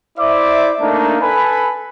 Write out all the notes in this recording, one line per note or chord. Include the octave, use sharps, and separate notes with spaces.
E4 C5 D5 E5 D6
A3 A#3 D4 D#4
A4 B4 G#5 B5